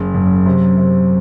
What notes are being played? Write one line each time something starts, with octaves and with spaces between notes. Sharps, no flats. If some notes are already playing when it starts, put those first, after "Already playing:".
Already playing: F#1
F#2
C3
C3